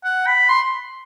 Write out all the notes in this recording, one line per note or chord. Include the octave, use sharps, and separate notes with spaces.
F#5
B5
C6